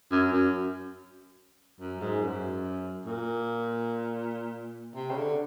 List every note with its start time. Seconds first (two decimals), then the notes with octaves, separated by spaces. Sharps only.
0.12 F#2
0.33 F#2
1.81 F#2
2.01 G#2
2.22 F#2
3.06 A#2
4.96 C3
5.11 C#3
5.17 D3